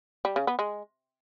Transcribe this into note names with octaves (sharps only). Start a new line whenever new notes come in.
G3
C#3
B3
G#3